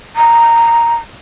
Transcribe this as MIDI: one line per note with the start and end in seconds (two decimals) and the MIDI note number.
0.16 0.95 82